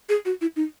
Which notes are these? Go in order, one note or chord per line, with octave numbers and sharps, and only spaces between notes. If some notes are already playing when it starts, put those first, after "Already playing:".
G#4
F#4
E4
D#4